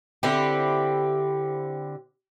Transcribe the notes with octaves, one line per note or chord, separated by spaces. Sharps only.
D3 C4 E4 G4